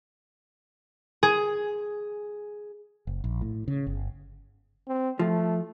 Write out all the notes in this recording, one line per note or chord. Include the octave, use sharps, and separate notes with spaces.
G#4
F#1
A#1
A2
C#3
G1
C4
F3 A3